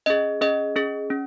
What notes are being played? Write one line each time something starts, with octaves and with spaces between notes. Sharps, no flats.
C#4 G#4 D#5
C#4 G#4 D#5
C#4 G#4
C#4